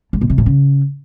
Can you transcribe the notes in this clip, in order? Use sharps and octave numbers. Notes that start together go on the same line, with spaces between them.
G#2
B2
C3
A2
C#3